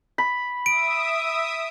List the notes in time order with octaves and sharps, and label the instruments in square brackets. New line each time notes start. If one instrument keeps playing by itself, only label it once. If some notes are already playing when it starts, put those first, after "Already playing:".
[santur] B5
[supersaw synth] E5 D#6 [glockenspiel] D7